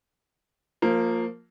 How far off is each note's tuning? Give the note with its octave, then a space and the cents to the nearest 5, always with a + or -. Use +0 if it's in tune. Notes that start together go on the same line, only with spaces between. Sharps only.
F3 +15 A#3 -10